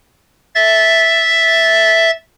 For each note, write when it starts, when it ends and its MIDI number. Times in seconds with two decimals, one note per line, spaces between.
0.55 2.11 76
0.55 2.11 93